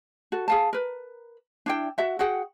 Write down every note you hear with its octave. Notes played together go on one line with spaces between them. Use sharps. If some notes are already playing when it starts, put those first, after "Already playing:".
F#4 A4
G#4 F5 A5
A#4 B4
D4 E4 G5
F#4 E5 F#5
F#4 G#4 F#5 G5